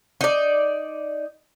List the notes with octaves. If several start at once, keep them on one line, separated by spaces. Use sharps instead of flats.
D#4 D5